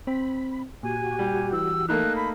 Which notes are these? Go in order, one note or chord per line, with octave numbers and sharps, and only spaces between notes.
C4 B5
A#2 F#4 G4 G#5
G3
E3 E6
A3 A#3 D#4 F#6
B5